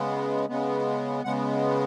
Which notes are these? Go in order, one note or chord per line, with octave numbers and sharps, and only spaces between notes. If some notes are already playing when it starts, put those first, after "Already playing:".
Already playing: C#3 G#3 B3
C#3 G#3 B3
C#3 G#3 B3 F#5